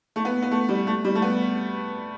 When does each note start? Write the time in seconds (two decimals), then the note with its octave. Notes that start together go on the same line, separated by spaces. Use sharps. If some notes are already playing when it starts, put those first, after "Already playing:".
0.16 A3
0.25 B3
0.42 B3
0.51 A3
0.69 G3
0.87 A3
1.05 G3
1.15 A3
1.22 B3